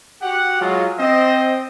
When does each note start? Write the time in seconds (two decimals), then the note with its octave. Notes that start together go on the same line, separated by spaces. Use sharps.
0.22 F#4 G4 F#5
0.61 F#3 G#3 F4
0.99 C4 C5 D#5